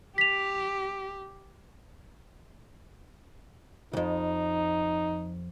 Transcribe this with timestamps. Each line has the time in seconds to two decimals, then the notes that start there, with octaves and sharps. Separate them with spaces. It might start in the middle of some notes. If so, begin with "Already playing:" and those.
0.18 G4 B6 F7
3.93 C2 F2 D#4